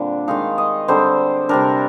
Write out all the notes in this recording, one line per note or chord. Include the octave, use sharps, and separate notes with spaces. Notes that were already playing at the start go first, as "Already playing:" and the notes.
Already playing: A#2 D3 G3 C4 D4
D#3 G#3 D#4 F5
D#5
D3 G3 C4 C5
C3 G3 D4 A#4